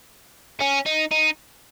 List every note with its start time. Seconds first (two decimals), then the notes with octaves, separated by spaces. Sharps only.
0.61 C#4
0.86 D#4
1.11 D#4